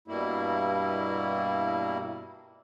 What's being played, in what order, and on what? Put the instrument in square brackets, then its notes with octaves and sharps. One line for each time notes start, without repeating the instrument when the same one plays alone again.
[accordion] G2 B2 G3 A#3 E4